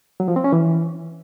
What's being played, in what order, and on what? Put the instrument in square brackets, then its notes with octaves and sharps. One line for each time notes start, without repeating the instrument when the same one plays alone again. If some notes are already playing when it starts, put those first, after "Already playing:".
[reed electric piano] F#3
F3
C4
C#4
E3